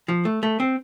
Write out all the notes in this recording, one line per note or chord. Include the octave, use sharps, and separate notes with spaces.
F3
A3
A3
C4